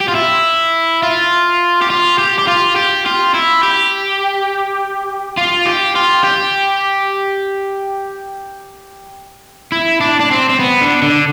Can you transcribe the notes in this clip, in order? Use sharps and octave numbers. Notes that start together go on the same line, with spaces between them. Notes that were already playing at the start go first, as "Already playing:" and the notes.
G4
F4
E4
F4
G4
F4
G4
G4
F4
G4
F4
E4
G4
F4
G4
F4
G4
E4
D4
D4
C4
C4
B3
D3
D3